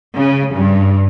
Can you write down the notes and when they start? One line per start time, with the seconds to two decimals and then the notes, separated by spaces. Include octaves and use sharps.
0.16 C#3
0.54 G2